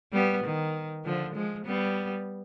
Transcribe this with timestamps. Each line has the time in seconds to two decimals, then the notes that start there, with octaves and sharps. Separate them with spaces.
0.13 G3 B3
0.44 D#3
1.05 D3 F3
1.35 F3 G#3
1.66 G3 B3